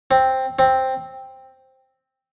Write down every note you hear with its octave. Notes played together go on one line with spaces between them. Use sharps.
C4
C4